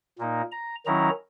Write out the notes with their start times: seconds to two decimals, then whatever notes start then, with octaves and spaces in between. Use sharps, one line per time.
0.18 A#2 A#3 D#4
0.52 A#5
0.86 D#3 F#3 C#4 E4 A#5